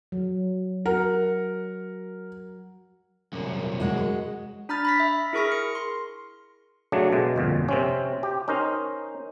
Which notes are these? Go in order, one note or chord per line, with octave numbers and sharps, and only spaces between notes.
F#3
F#4 A#4 F#5
C2 F#2
G#3 F#4
D4 A#5 B5 F6 A6
B5 A#6 B6
E5
E4 G#4 A#4 C#6 F6 A#6
C#7
C6
C#3 F#3 A3 D4
B2 G#3
G1 F2 A#2
C3 C4 C#4
G4
C#4 D#4 A#4 C5